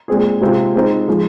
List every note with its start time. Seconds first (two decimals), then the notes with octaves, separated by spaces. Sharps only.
0.08 A#2 G#3 C4 G#4
0.41 C3 G#3 C4 F4
0.74 G#3 C4 D#4 C5
1.08 F3 G#3